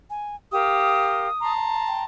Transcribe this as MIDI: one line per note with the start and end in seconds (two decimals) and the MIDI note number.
0.10 0.36 80
0.52 1.27 67
0.52 1.27 70
0.52 1.27 77
0.52 1.52 87
1.41 2.05 81
1.41 2.05 82
1.41 2.05 84
1.88 2.04 79